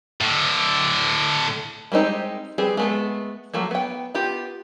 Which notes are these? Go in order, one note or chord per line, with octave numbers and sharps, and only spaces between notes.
A2 D3
G3 G#3 C4 D#4 G4
G3 C4 G#4 B4
G#3 A3 B3
F3 F#3 A3 A#3
B3 G5
B3 F4 G4